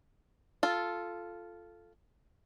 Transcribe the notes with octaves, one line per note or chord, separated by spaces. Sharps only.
F4 A4